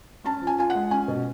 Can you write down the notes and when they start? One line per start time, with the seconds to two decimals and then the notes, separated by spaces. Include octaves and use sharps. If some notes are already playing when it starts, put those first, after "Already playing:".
0.24 C#4 A5
0.41 F3
0.47 G#5
0.59 F4 G#5
0.70 G#3 F#5
0.91 C#4 G#5
1.08 B2